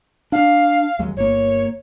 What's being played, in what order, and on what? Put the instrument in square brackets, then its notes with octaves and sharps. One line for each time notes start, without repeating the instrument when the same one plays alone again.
[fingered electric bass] D4 [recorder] F5
[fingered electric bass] D#2 F#3 G#3
[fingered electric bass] G1 A#3 [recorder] C#5